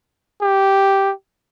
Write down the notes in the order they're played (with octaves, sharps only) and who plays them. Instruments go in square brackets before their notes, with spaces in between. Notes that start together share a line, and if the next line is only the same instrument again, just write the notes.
[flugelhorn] G4